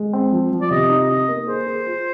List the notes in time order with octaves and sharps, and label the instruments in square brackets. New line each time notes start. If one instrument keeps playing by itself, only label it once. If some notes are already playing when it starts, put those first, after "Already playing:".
Already playing: [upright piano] G#3
C4
F3
F3
[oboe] D5
[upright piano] C3 [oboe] D#5
[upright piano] D#4
[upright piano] D#4 [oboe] D#5
[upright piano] A#3
[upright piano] G#4 [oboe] C5
[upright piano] G#4
F4